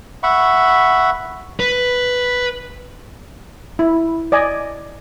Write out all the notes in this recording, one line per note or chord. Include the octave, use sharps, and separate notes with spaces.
E5 F#5 B5 C#6
B4
E4
D5 D#5 G#5